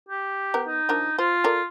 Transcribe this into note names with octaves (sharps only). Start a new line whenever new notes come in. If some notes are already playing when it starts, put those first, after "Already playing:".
G4
B3 A#4
D#4
F3 D4 A#4
F4 C5
A4 A#4 D5